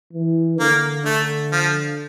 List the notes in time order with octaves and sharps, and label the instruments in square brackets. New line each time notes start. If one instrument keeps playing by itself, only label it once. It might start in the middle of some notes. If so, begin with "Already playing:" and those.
[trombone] E3
[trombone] D3 [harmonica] A#3
[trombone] D3 [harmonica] A3
[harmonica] F3